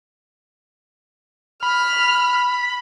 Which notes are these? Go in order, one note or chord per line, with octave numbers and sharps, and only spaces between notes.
B5 F6